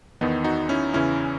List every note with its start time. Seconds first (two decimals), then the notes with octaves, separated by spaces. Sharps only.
0.21 E2 D#3 B3 D#4
0.44 D#4 F#4
0.69 C#4 E4
0.94 E2 C#3 E3 C#4 E4